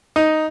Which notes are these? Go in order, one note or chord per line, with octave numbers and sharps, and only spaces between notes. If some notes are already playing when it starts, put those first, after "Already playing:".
D#4